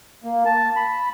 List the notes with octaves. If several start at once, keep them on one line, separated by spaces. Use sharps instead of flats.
A#3
A5
B5